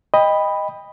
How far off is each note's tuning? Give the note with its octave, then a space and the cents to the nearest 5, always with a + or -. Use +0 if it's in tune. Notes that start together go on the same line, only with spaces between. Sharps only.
D#5 +0 G5 +25 B5 +0